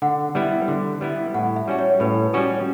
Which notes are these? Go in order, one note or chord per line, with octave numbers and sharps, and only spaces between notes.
D3 F#5
G3 B3 E4
D3
G3 B3 E4
A2 F#5
E5
G3 C#4 F#4
C#5
A2 B4
G3 C#4 F#4 A4